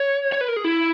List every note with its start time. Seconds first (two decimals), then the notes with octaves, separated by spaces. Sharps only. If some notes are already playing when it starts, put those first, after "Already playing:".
Already playing: C#5
0.32 C#5
0.41 B4
0.48 A#4
0.56 G#4
0.64 E4